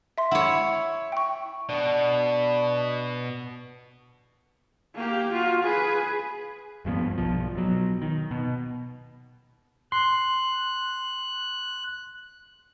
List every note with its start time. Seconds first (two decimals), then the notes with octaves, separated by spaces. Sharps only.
0.18 E5 C6
0.31 E4 C#5 F#5
1.12 G5 C#6
1.69 B2 D4
4.95 A#3 G4
5.32 F4 F#4
5.63 G#4 B4
6.85 D#1 G2 F3 B3
7.18 B1 F3
7.55 B2 F#3
8.02 D#3
8.31 B2
9.92 C6 F#6